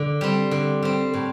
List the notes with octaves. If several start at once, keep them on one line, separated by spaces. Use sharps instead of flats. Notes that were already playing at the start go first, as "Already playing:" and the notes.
Already playing: D3
G3 C4
D3
G3 C4
A2